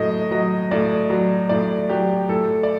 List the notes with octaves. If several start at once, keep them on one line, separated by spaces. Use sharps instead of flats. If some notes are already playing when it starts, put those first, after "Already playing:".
Already playing: A2 F#3 D#5
F#3 D#5
A2 D5
F#3
A2 D5
F#3 G4
A2 A4
D5